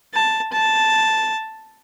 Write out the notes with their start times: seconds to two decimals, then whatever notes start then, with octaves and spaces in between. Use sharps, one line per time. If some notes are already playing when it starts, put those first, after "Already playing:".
0.14 A5
0.53 A5